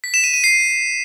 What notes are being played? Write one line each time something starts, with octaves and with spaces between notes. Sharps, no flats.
B6
E7
D#7
D#7
C7